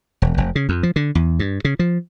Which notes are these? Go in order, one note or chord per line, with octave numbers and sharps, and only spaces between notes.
E1
F1
C#3
F2
F3
D3
E2
G2
C#3
F3